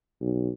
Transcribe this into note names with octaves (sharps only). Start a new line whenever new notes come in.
B1